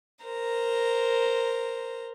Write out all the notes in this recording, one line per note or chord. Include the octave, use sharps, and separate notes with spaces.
A#4 C5 A#5